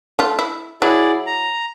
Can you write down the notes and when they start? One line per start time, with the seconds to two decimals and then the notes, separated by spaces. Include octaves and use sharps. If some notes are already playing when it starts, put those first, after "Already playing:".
0.19 A3 F4
0.39 E4
0.82 F#3 E4 G#4 D5
1.26 A#5